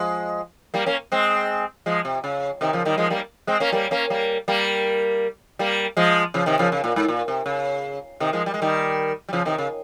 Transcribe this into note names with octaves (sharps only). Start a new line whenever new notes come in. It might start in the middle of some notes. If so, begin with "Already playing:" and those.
Already playing: F3 G#3
G3 A#3
A#3 C#4
G#3 C4
F3 G#3
C3
C#3
C3 D#3
C#3 F3
D#3 G3
F3 G#3
G3 A#3
G#3 C4
A#3 C#4
G3 A#3
A#3 C#4
G3 A#3
G3 A#3
G3 A#3
F3 G#3
C#3 F3
C3 D#3
C#3 F3
C#3
A#2
G#2
A#2
C3
C#3
C3 D#3
F3 G#3
G3
G#3
D#3 G3
G3
C#3 F3
C3 D#3
C#3